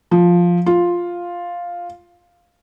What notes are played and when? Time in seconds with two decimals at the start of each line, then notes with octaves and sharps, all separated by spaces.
0.11 F3
0.66 F4